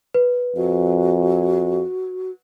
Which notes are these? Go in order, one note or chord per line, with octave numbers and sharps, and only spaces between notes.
B4
F2 F#4